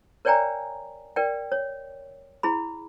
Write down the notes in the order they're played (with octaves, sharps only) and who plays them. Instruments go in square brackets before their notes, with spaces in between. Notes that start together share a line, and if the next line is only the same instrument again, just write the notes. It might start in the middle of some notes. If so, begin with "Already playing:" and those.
[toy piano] A#4 C#5 D5 G5 G#5 A#5
A#4 D5 G5
C#5
E4 G#4 B5